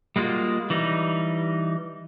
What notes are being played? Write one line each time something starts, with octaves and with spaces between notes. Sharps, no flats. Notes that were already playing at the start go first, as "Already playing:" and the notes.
G3 G#3 A#3 F4 F#4
E3 G3 D#4